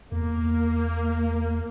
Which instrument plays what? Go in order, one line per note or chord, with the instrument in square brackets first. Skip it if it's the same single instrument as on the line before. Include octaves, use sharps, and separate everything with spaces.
[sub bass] E2 [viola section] A#3